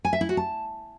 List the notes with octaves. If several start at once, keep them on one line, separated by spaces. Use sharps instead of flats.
G#5
E5
E4
F#4
A5